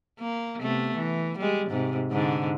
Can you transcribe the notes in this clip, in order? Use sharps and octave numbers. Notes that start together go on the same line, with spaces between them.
A#3
C3 A3 B3
E3
G3 G#3
G#2 C3
G#2 D3